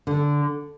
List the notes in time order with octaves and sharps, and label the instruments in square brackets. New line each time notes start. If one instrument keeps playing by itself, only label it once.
[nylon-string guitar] D3